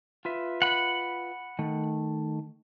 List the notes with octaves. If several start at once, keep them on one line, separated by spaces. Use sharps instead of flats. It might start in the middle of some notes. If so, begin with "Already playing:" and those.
F4 B4 E5
F#5 B5
D#3 A3